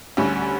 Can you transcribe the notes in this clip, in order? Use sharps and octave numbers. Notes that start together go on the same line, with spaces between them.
D2 D3 G3 C#4